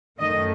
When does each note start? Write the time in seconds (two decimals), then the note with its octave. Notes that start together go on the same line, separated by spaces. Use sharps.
0.19 F#2 D#3 A3 D#5